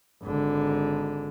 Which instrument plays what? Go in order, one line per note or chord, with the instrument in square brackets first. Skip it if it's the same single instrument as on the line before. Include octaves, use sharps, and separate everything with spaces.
[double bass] G#1 D3